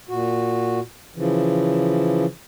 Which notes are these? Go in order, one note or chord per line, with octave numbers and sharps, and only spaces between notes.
A#2 F#4
C#3 E3 F3